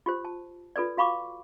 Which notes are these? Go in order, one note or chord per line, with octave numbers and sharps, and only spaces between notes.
F4 G4 C5
A5
F4 A4 B4 D5
F#4 F5 B5 C#6 D6